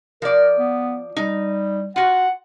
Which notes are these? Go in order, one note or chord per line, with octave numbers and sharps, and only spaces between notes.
F3 A#4 D5
B3
G3 D#4
F4 F#4 F#5